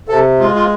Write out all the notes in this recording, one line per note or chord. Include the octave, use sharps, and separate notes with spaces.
C3 A4
G#3 F4
F4